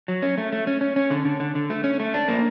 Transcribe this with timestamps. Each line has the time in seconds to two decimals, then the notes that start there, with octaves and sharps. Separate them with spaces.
0.08 F#3
0.22 C#4
0.38 A3
0.53 A3
0.67 C#4
0.81 C#4
0.96 C#4
1.11 D3
1.25 D3
1.40 D3
1.55 D3
1.70 A3
1.84 C#4
2.00 A3
2.14 D4
2.28 A#3